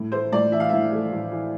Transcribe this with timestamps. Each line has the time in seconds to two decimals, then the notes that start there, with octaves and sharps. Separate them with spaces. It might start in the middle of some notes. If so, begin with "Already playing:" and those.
Already playing: A2
0.12 A3 C5
0.32 A2 D5
0.52 E3 E5
0.60 F5
0.69 A2 E5
0.92 A3
1.12 A2
1.32 E3